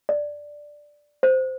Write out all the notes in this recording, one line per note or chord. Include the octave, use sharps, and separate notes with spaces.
D5
C5